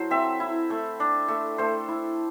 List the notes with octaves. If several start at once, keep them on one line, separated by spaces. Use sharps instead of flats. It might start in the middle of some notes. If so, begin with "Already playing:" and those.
Already playing: F#3 E4 A4 C5
C4 E5
E4
A3
D4
A3
A3 C5
E4